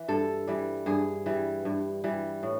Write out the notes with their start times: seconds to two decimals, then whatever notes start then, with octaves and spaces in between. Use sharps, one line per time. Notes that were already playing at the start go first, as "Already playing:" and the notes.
Already playing: E3
0.08 G2 A4
0.47 E3 G3
0.86 G2 G#4
1.26 E3 G3
1.65 G2
2.04 E3 G3
2.43 A2